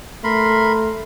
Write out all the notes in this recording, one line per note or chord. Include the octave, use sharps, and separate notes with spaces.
A3 A#4 B5 C6